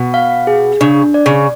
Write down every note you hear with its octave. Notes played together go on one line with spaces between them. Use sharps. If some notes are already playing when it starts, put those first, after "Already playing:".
Already playing: B2
F5
G#4
C#3 D4
D5
C#3